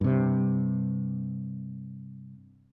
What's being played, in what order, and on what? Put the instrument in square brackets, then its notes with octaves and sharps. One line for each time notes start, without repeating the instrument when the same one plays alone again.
[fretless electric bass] G2 C3